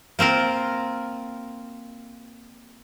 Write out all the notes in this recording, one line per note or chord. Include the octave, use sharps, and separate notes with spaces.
A#3 C4 F4 A#4